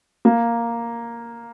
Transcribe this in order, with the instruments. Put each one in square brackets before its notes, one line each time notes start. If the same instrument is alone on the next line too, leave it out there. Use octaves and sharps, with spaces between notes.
[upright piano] A#3